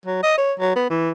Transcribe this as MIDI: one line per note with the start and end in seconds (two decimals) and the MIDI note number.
0.06 0.20 54
0.23 0.37 75
0.38 0.53 73
0.60 0.74 54
0.76 0.90 59
0.90 1.12 52